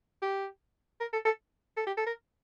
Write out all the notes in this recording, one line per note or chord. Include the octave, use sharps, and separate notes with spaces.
G4
A#4
A4
A4
A4
G4
A4
A#4